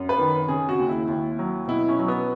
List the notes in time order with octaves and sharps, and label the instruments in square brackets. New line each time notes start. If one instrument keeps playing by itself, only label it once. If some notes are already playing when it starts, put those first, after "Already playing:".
Already playing: [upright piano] F#2
B4
D#3
C#3 G#4
F#4
D#2
E4
D#2
F#3
B2 E4
C#4
F#3
B3